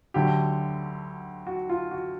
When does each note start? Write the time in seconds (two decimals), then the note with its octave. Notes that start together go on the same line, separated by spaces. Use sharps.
0.14 D2 D3 F#3 G4
1.47 F#4
1.69 F4
1.91 F#4